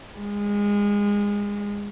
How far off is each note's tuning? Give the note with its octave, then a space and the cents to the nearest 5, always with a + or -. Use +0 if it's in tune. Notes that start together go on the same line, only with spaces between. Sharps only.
G#3 -25